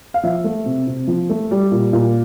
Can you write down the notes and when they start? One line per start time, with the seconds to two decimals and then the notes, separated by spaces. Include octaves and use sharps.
0.14 F5
0.24 F3 E5
0.44 A3
0.66 C3
0.87 C3
1.08 F3
1.29 A3
1.51 G3
1.71 A#2
1.93 A#2